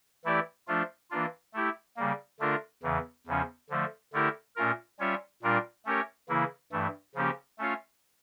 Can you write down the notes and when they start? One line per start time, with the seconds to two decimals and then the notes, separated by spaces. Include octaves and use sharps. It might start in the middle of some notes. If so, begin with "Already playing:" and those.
0.25 E3 A3 E4 G4 D5
0.67 F3 A3 D4 F4
1.10 E3 A#3 D4 F4
1.54 A3 E4 G4
1.97 C#3 G3 A#3
2.40 D3 A3 D4 F4 A#4
2.83 E2 C#3 E3
3.27 E2 C#3 F3 C#4
3.70 D3 F3 A3
4.13 D3 A3 E4 G4 A#4
4.56 A#2 A3 C#4 F4 A#4
4.99 G3 C#4 F4 C#5 E5
5.42 A#2 G3 D4 F4 A#4
5.85 A3 C#4 G4 A#4 C#5
6.29 C#3 E3 A#3 E4
6.72 G2 E3 A3
7.15 C#3 F3 A#3 C#4 G4
7.59 A3 C#4 F4 C#5 F5